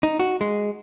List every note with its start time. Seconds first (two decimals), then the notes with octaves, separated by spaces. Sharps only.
0.03 D#4
0.20 F#4
0.41 G#3